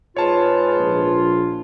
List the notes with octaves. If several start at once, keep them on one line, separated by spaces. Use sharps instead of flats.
G#2 F4 G#4 B4 C#5 A5
A#1